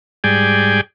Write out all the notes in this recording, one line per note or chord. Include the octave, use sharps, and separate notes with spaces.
G#2 G3 G#4 D5 G5 G#5